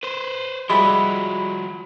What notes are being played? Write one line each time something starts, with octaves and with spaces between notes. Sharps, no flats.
B4 C5
F3 G3 G#3 E4 F#4 B5